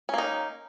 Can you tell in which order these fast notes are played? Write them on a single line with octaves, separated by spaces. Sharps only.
C#4 A#3 D#4